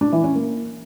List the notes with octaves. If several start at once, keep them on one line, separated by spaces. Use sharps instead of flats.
D4
E3
C#4
A#3